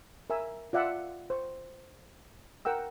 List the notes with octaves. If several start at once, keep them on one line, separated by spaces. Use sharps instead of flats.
A#4 E5 G#5 E6
F4 D5 E5 F#5 A5 E6
C5 C#6
A#4 F#5 G5 E6